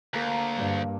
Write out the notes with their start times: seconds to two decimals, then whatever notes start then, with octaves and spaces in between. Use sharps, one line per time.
0.13 D2 A#3 A#4
0.56 G2